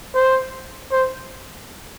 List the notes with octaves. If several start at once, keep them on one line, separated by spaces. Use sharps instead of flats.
C5
C5